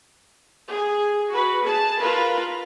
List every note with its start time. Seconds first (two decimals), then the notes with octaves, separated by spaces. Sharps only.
0.70 G#4
1.30 F#4 B4
1.62 G#4 A5
1.99 F4 A#4 B4